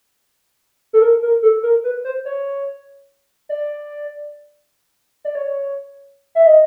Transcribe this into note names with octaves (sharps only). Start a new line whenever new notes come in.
A4
A#4
A#4
A4
A#4
B4
C5
C#5
D5
D5
C#5
E5
D#5